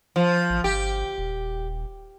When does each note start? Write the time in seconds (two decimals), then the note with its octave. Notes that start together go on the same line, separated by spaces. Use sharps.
0.16 F3
0.50 A1
0.64 G1 G4
1.18 D#1